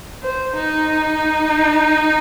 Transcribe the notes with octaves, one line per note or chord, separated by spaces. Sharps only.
C5
D#4